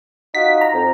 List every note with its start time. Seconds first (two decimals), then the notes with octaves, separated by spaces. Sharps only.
0.35 D#4 F4 F#4 B6
0.61 A#5
0.73 F2